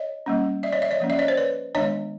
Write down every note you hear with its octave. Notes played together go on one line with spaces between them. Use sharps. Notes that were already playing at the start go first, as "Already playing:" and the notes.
Already playing: C#5 D#5
G3 A#3 C#4
D5 E5
C#5 D#5
D5 E5
C#5 D#5
F3 A#3 C#4
D5 E5
C#5 D#5
C5 D5
B4 C#5
D#3 G#3 B3 D4 C#5 D#5